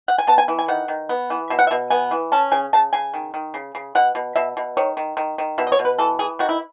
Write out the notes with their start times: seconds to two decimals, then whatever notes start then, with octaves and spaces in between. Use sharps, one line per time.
0.08 F#5
0.18 G#5
0.27 B3 A5
0.38 G#5
0.48 E3
0.59 G#5
0.68 D#3 F#5
0.88 D#3
1.09 B3
1.30 E3
1.50 B2 E5
1.59 F#5
1.67 E5
1.71 B2
1.90 B3 G#5
2.11 E3
2.32 C#4 A5
2.51 C#3 G#5
2.73 C#3 A5
2.93 C#3 G#5
3.14 D#3
3.34 D#3
3.54 C#3
3.75 C#3
3.95 B2 F#5
4.15 B2
4.36 B2 E5
4.57 B2
4.77 D#3 C#5
4.97 D#3
5.17 D#3
5.38 D#3
5.58 B2 E5
5.67 D#5
5.72 C#5
5.79 B2
5.85 B4
5.98 E3 A4
6.19 E3 G#4
6.39 D#3 F#4
6.49 E4